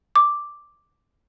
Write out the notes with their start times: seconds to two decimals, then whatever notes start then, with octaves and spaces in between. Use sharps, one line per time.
0.16 D6